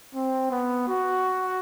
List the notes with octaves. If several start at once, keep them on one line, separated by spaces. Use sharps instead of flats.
C4
B3
F#4